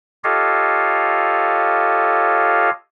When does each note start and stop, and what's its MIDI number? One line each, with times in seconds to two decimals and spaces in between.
0.24 2.70 65
0.24 2.70 67
0.24 2.70 69
0.24 2.70 73
0.24 2.70 75
0.24 2.70 77